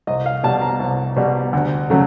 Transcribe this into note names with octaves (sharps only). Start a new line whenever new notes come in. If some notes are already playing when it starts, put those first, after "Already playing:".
C2 D#5
F5
B2 G3 A5
A#5
C2
B2 G3
D2
C#3 F#3 A3